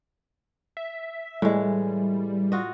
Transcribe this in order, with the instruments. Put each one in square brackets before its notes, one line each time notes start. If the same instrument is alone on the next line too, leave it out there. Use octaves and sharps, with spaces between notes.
[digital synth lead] E5
[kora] A2 E3 G#3 [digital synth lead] G3
[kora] F4 F#4 D#5